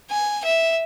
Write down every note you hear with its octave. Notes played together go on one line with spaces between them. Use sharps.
G#5
E5